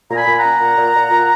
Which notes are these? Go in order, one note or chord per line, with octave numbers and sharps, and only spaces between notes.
A#2 A#5
G#5 B5
A#2
F#5 A#5
C#4
A#2
A#2
A#2
A#2